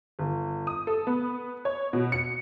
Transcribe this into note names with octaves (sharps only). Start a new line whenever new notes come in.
G1
D#6
A4
B3
C#5
B2
C#7